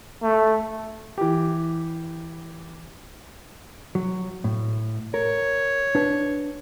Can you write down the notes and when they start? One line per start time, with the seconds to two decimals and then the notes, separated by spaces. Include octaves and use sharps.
0.22 A3
1.18 E3 G4
3.95 F#3
4.44 A2
5.14 A#4 C#5
5.95 D4 B4 A5